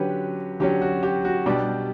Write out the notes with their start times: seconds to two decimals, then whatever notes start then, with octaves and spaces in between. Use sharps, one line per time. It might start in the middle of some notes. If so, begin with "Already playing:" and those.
Already playing: D3 F#3 C#4 G4 B4
0.60 D3 F#3 C#4 G4
0.82 F#4
1.03 G4
1.25 F#4
1.46 B2 G3 D4 G4